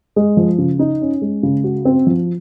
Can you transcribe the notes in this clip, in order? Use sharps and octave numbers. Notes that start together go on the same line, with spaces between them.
G#3
F3
C#3
D#4
C#4
G#3
C#3
F#4
C4
F3